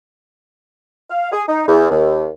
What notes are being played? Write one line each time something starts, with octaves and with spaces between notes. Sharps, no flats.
F5
G#4
D#4
E2
D#2